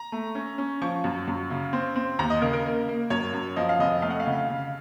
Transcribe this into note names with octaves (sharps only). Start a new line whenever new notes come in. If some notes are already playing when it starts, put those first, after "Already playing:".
Already playing: A#5
A3
C#4
C#4
F3 C#6
F#2
F#2
C#3
C4
C4
D#2 A#5
D#5
C#3 A#4
A#4
A#3
A#3
F#2 C#5
F#2
F3 D#5
F5
F1 D#5
A3 F5
F#5
F5
C#3
C#3